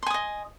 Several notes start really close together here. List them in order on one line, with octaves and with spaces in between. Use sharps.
C6 G#5 D#6 D#5